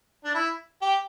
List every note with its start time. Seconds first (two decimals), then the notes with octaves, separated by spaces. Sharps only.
0.25 D4
0.35 E4
0.82 G4